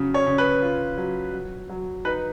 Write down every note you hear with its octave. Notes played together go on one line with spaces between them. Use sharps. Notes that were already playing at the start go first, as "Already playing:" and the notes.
Already playing: C#3 F#3
C#5
C#3
B4
F4
F#3
F#3
F#3
D#4 B4